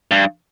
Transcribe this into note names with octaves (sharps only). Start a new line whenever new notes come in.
G2